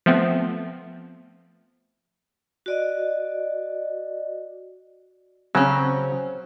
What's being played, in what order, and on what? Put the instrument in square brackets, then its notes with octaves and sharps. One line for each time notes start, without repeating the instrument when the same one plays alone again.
[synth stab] F3 A3 B3 C4
[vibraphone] F#4 D5 D#5
[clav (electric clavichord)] C#3 F#3 [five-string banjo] C4 C#4